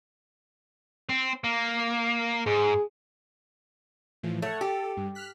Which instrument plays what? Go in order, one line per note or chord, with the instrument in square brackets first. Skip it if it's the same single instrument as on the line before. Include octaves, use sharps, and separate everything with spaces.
[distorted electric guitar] C4
A#3
[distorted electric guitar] G#2 [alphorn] G#4
[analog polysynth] A2 E3 F3
[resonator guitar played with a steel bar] A3 [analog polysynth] C#5 F#5
[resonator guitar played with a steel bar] G4 [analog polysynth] A4
[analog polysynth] G2
F6 F#6 B6